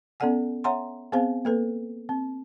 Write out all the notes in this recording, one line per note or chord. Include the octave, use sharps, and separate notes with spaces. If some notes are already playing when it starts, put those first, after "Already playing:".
B3 C#4 A4 D5 F#5 G#5
C#5 E5 F#5 G#5 A#5 C6
B3 C4 G#4 C5 F5 G#5
A#3 A4 B4
C4